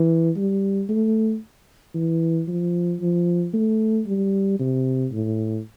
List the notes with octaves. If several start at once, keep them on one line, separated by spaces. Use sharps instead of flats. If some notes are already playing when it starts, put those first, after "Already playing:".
Already playing: E3
G3
A3
E3
F3
F3
A3
G3
C3
A2